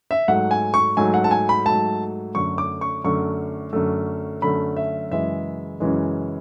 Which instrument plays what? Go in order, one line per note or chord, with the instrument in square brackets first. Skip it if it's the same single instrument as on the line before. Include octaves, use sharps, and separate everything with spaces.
[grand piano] E5
G#2 F#3 A3 F#5
G#5
C#6
G#2 F#3 A3 G#5
F#5
A5
G#5
B5
G#2 F#3 A3 A5
F#2 D3 A3 C#6
D6
C#6
F#2 D3 A3 C#6
F#2 D3 A3
F#2 D3 A3 B5
E5
F#2 C#3 E3 G#3 E5
F#2 C#3 E3 G#3